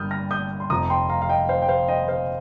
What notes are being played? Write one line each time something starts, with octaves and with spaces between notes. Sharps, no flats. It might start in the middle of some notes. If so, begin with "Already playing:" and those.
Already playing: G1 G2 A#3 D#6 F6 G6
F6 A#6
D#6 G6
C6
F1 F2 F3 A#5 D#6
G5 C6
F5 A#5
F5
D#5 G5
C5 F5
G5
C5 F5
D#5 G5
C5 F5